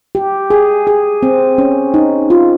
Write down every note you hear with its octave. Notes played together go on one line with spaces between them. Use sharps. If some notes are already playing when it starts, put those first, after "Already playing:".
G4
G#4
G#4
C4
C#4
D#4
F4